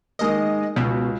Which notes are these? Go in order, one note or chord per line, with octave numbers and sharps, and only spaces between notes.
D#3 G#3 A#3 D#5
C#2 B2